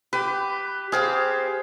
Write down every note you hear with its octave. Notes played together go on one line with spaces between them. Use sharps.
G4 B4
C4 G4 G#4 C5 F5